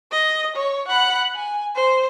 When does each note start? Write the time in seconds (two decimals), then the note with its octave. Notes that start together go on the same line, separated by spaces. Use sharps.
0.12 D#5
0.56 C#5
0.88 F#5 B5
1.35 G#5
1.75 C5